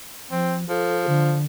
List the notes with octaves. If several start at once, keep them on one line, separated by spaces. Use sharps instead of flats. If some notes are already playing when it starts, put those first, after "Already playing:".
F3 C4
F3 A4
D3